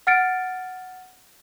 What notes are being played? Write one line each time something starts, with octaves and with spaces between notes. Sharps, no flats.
F#5 F6 A6 C#7 D7